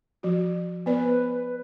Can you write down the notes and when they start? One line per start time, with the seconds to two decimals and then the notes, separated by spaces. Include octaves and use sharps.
0.23 F3 F#4
0.86 B3 B4 C5 D5